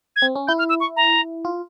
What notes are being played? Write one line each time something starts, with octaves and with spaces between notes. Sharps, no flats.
G#6
C4
C#4
E4 G6
F6
E6
C#6
A#5
F4